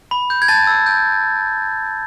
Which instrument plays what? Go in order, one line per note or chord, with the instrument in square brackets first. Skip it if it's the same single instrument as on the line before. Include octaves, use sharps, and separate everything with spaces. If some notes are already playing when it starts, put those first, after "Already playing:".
[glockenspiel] B5
G6
G#6
A5 A6
E6
G6